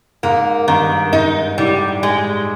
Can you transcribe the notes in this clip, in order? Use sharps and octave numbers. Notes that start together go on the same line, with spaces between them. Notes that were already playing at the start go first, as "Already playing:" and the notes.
G#2 A#3
G2 D#3
G#2 D#4
A2 G3
G#3